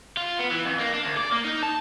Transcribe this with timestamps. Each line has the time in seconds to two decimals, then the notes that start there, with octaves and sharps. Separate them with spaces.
0.17 F4
0.39 B3
0.51 E3
0.65 F2
0.79 A#3
0.94 D4
1.06 D2
1.17 D5
1.32 A#3
1.45 D#4
1.63 A5